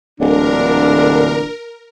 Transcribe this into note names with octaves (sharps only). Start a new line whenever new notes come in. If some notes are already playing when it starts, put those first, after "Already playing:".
D1 A#2 D3 E3 D4 A#4